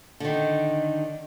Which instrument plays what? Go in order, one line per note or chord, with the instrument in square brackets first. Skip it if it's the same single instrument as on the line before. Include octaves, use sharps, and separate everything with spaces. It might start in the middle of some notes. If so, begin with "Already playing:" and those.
[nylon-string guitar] D3 D#3